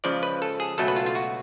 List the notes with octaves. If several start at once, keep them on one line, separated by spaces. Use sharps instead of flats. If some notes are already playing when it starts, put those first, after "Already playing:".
C#2 C#3 F3 D5
B4
A4
G#4
C#2 B2 F#3 A3 A4
B4
F4
F4
F#4